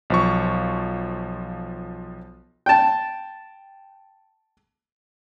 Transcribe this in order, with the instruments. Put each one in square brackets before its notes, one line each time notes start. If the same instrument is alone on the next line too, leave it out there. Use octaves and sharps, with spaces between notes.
[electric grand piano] B1 F3 C#6
[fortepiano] G5 A5